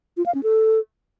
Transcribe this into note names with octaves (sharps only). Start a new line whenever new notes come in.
F4
F5
C#4
A4